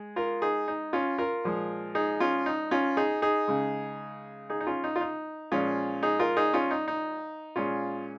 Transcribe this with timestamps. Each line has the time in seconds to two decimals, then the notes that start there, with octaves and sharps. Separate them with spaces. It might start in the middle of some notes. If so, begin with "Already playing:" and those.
Already playing: G#3
0.16 F4 A#4
0.42 D#4 G#4
0.68 D#4
0.93 C#4 F4
1.18 F4 A#4
1.44 A#2 F3 G#3
1.95 D#4 G#4
2.20 C#4 F4
2.46 D#4
2.71 C#4 F4
2.97 D#4 G#4
3.22 D#4 G#4
3.48 C#3 G#3
4.50 D#4 G#4
4.61 D#4
4.67 C#4 F4
4.84 D#4
4.96 F4
5.01 D#4
5.52 A#2 F3 G#3 C#4 F4
6.03 D#4 G#4
6.19 F4 A#4
6.37 D#4 G#4
6.54 C#4 F4
6.71 D#4
6.88 D#4
7.56 A#2 G#3 C#4 F4